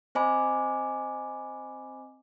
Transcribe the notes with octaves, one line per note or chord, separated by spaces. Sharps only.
C4 C5 D#5 G#5 B5 D6